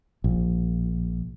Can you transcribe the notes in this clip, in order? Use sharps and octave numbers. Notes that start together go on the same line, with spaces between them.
A#1